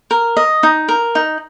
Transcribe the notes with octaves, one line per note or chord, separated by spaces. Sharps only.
A#4
D#5
D#4
A#4
D#4